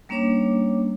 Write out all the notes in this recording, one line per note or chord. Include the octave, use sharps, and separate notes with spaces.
G3 A#3 C#4 D4 C#5 D6